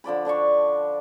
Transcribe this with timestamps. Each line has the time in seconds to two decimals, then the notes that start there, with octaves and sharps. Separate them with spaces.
0.04 D3 F3 D5 B5
0.25 D3 D4 D5 C#6